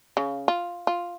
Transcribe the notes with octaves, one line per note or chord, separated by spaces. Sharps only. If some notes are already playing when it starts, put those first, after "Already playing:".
C#3
F4
F4